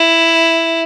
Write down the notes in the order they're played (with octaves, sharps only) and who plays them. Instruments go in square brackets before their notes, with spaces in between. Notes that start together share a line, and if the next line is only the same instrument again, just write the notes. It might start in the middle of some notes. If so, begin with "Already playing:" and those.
Already playing: [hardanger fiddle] E4